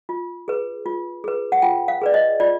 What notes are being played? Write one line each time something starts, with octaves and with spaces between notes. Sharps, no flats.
F4
G#4 B4
F4
G#4 B4
F#5
F4 G5
F5
G#4 B4 D5
D#5
F4 D5